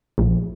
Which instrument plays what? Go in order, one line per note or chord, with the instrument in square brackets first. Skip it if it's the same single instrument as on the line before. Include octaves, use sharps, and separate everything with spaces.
[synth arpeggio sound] A#1